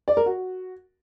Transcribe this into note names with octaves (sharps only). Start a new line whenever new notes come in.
D5
A#4
F#4